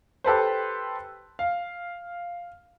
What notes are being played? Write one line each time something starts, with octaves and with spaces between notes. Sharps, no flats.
G4 A4 B4 C5
F5